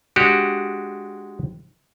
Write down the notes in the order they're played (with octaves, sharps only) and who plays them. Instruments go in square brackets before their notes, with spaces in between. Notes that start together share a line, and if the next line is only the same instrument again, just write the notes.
[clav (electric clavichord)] G#3 D4 F#4 G4